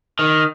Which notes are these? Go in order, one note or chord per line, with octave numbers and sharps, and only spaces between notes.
D#3